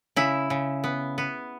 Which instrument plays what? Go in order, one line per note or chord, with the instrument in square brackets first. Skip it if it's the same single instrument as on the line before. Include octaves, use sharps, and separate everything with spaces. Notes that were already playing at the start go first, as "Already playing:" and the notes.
[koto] C#3 E4
C#3
B3
B3